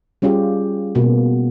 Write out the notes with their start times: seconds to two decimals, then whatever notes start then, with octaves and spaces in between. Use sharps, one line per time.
0.22 G3 C#4 F4 G4 G#4
0.95 B2 A#3 B3